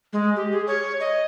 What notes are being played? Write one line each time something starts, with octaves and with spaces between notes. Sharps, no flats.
G#3
G4
G#4
C#5
D#5